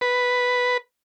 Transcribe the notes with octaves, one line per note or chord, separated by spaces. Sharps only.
B4